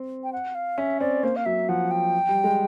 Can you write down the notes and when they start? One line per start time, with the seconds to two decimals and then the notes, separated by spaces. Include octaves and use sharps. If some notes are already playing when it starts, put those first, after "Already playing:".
Already playing: C4
0.23 G5
0.33 F#5
0.55 F5
0.78 C#4 E5
1.00 C4 D5
1.23 A#3 C5
1.36 F5
1.45 F#3 E5
1.69 F3 F#5
1.91 G5
2.29 G3
2.44 G#3